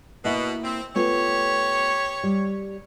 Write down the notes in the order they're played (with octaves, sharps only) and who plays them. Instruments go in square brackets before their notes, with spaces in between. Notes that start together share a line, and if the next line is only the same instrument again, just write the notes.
[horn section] B2 [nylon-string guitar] A#3 E4 E5
[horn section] C4
[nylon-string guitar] A3 B3 F4 [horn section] G4 C#5
[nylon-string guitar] G3